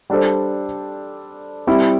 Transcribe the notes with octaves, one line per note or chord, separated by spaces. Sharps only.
G3 D4 A4 C5
G3 C4 E4